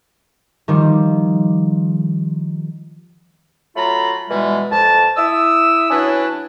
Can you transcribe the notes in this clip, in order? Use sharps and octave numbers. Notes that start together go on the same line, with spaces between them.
D#3 F3 G3
F#3 A3 F4 A#5 B5
B2 E3 G3 G#3
F2 A5
E4 D#6 E6
F#3 C#4 D4 E4 B4